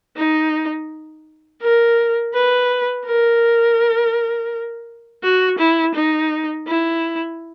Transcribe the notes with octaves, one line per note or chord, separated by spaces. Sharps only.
D#4
A#4
B4
A#4
F#4
E4
D#4
E4